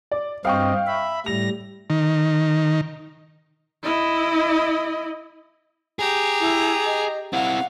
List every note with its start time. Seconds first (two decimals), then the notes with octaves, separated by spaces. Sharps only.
0.12 D5
0.45 G2 C4 D#5 F5 G5 C#6
0.87 E5 B5
1.26 A2 G3 A#6 F7
1.90 D#3
3.83 E4 D#5
5.99 G4 G#4 A#5
6.40 E4
6.86 D#5
7.33 C4 E4 F5 F#5